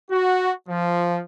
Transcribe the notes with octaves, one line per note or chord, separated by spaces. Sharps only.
F#4
F3